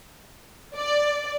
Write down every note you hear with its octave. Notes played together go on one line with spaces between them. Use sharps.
D5